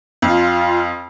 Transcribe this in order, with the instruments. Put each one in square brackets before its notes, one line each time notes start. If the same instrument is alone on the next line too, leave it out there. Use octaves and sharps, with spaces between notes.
[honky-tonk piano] F2 [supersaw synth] F4 F5